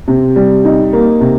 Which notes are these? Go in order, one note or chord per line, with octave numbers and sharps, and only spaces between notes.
C3
G3
D#4
A#3
C3